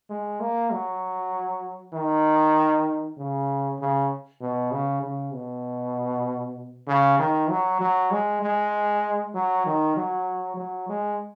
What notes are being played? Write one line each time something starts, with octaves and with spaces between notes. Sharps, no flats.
G#3
A#3
F#3
D#3
C#3
C#3
B2
C#3
C#3
B2
C#3
D#3
F#3
F#3
G#3
G#3
F#3
D#3
F#3
F#3
G#3